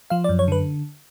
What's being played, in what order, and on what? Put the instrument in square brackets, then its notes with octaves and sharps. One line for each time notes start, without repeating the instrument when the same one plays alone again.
[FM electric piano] F3 F5
D5
F#2
C#5
D3 B4